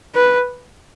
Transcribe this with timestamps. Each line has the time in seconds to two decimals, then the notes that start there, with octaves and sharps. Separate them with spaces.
0.15 B4